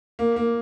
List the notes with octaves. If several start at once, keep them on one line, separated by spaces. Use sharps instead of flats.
A#3
A#3